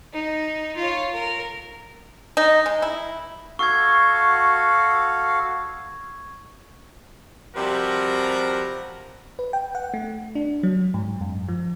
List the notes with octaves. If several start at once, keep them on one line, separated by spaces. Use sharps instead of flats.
D#4
F4 C#5
A#4
D#4
G#3
E4
F#4 A4 F5 C#6 G#6
C3 F3 G3 C4 F#4 A#4
B4
G5
F#5
A3
D4
F#3
G#2
F#2
F3